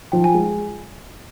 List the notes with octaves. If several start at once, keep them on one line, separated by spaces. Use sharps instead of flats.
F3 G5
G#5
G#3